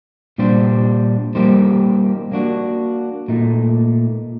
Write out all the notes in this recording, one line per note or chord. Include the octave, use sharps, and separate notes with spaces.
A#2 G3 D4 G4 C5
G3 A#3 D#4 G4 C5
A#3 D4 F#4
A#2 A3 D#4